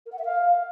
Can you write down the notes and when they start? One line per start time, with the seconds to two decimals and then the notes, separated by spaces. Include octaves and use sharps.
0.06 A#4
0.12 F#5
0.18 E5
0.25 F5